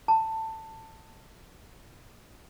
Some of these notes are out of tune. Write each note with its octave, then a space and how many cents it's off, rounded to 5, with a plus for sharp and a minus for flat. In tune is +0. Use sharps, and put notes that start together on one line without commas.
A5 +15